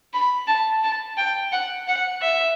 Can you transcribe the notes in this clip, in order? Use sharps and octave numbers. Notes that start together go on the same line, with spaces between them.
B5
A5
A5
G5
F#5
F#5
E5